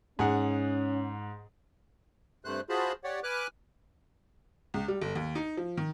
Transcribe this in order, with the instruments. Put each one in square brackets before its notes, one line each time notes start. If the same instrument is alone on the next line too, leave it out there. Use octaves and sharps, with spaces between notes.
[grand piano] G#2 [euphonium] C#4 [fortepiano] G#4 F#5
[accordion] G2 C3 A3 C5 F#6
F4 F#4 G#4 C5 A5 B5
G4 C#5 D5 F#5
B4 G#5 D6 F6 F#6
[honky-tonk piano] C#2
G3
G1
D#2
D#4
F3
D#3